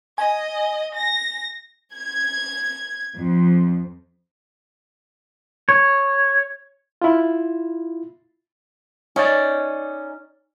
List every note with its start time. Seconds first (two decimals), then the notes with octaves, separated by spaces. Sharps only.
0.18 D#5 G#5
0.94 A#6
1.94 G#6
3.17 F2
5.69 C#5
7.02 E4 F4
9.16 C#4 D#4 D5